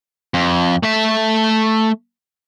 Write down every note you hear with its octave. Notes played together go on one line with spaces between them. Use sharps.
F2
A3 E5